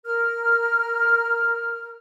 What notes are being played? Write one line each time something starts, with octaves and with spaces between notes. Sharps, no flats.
A#4 F6